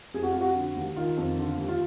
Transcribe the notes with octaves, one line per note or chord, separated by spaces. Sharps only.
F2 G#4
F#4
F2 F4
F#4
D3
D#2
D#3 F4
F2
D3
D#2
F4